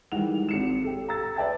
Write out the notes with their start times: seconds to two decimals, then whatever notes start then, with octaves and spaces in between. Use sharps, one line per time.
0.12 D#3 E3 G3 G#3 F#5 F7
0.49 G#1 C#7 E7
0.84 G4 A4
1.08 A#5 E6 A6
1.36 B4 D5 E5 G5 A5 A6